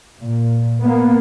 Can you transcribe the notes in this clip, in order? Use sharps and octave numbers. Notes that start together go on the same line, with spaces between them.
A#2
A#3 B3